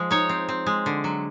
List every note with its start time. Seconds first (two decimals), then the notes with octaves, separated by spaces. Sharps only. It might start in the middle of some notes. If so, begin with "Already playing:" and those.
Already playing: F3 G#3
0.11 D#4 C#5
0.29 C4
0.49 C4
0.66 G#3
0.86 D3
1.04 F#3